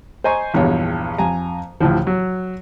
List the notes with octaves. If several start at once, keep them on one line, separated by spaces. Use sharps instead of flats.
C5 D#5 G#5 A#5 C#6
A#1 E2 G2 C#5
F2 G#5 A#5
A1 D2 A2 F3
F#3